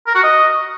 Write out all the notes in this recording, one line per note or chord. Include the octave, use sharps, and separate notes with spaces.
A#4
F#4
D#5